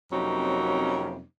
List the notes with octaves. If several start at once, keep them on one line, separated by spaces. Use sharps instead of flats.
F2 C3 F#3 A#3 C#4 D#4